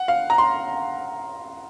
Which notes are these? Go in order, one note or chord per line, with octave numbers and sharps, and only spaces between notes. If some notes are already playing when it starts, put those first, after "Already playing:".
Already playing: F#5
F5
A#5
C6